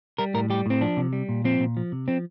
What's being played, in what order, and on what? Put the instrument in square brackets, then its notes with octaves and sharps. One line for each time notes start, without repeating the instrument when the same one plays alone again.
[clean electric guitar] G3 A#4
A2 A#4
G3 G4
A2 C4
F3 D4
C3
G3
A#2
F3 C4
A#2
F3
C3
F3 C4